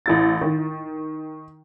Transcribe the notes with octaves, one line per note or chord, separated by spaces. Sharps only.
A1 E4 A6
D#3